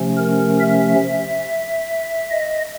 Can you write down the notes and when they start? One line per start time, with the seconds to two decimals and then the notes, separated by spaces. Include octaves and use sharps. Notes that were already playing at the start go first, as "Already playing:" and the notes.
Already playing: C3 F3 A3 C#4
0.18 A#4
0.60 E5
2.30 D#5